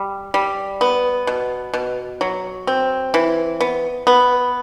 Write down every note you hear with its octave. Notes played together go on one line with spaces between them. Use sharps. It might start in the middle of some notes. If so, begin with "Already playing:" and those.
Already playing: G3
G3
B3
B2
B2
F#3
C4
E3
B3
B3